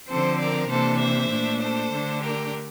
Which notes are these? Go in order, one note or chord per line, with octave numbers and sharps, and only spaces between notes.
D3 F3 C4 A4 C5
A#4 D5
C3 E3 A#3 D4 A4 C5
C5 E5
A#2 A3 D4
A4 C5
D3 A3 D4
G4 A#4